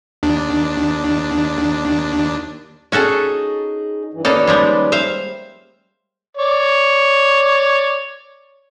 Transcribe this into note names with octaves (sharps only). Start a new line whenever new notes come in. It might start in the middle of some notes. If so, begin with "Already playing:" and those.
D#2 D4
C#4 D#4 F#4 G#4 A4
G2 E3
D#2 A#3 C#4 D#4 A4 B4 D5
F3 G3 G#3
C5 E5 F5
C#5 D5